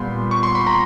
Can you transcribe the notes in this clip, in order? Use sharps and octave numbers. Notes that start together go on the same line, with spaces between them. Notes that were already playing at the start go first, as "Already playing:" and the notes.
Already playing: A#2 G3 B3 B5 C6
C#6
C6
B5
A#5